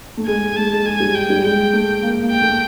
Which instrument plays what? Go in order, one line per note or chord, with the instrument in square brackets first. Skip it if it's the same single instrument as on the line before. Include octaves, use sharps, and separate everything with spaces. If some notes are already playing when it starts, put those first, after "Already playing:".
[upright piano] A3
[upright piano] G#3 [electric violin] G#5
[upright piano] G#3
G#3
[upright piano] A3 [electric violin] A5
[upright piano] G#3
[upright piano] G#3 [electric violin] G#5
[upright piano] G3
[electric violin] G5
[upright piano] G3
[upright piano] G#3 [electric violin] G5
[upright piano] A3
A#3
A#3
[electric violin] G5
[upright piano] A3